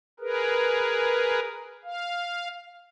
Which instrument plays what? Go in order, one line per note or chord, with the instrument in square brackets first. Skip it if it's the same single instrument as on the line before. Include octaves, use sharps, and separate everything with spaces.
[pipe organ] G#4 A#4 B4
F5